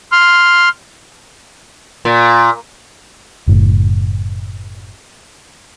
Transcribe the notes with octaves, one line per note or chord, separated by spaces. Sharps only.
C6 F6
A#2
F#1 A2